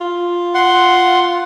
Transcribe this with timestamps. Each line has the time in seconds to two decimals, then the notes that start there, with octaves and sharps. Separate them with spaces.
0.01 F4
0.54 F#5 C6